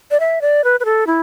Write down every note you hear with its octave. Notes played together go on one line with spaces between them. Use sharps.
D5
E5
D5
B4
B4
A4
E4